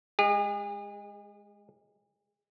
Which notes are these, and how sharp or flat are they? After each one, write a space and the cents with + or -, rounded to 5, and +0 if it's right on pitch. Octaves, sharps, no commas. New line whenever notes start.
G#3 -5 G#4 -40